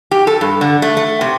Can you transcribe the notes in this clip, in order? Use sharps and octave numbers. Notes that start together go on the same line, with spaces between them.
G4
A4
G2
D3
A3
A3
C3